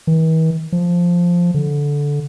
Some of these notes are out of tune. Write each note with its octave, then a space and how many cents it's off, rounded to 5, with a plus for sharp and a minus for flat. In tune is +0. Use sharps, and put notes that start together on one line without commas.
E3 -45
F3 +0
D3 -15